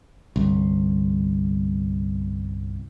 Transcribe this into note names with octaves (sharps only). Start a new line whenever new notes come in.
G1 C2